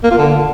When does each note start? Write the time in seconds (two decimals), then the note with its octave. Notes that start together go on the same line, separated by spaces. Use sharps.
0.04 A#3
0.11 F4
0.18 D3